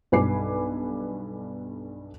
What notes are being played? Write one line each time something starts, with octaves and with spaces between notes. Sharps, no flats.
B1 G2 B4 G#5 D6 C7